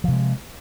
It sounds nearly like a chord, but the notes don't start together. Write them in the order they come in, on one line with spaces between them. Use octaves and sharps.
F3 C3 G#3